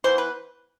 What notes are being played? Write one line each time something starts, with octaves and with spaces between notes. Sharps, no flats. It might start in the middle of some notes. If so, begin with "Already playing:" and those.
E3 B3 C5
B4